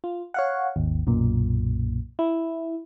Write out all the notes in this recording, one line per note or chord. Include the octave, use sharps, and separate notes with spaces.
F4
C#5 F5 F#5
G#1 D#2
B1 F#2 A#2
E4